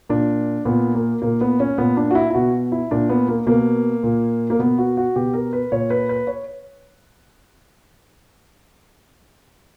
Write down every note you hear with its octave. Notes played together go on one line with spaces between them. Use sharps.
A#2 D4
A#2 B3
A#3
A#2 A#3
B3
C#4
A#2 B3
D4
F#4
E4
E4
B2 F#4
E4
A#2 D4
B3
A#3
B2 A#3
A#2
A#3
B2 B3
F#4
F#4
B2 G4
A#4
B4
A#2 C#5
B4
B4
C#5